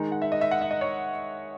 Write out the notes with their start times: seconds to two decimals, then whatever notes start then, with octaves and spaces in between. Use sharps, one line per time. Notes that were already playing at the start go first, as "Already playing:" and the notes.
Already playing: D#3 G#3 D#4
0.12 F#5
0.22 E5
0.32 D#5
0.41 E5
0.51 F#5
0.62 E5
0.71 D#5
0.81 C#5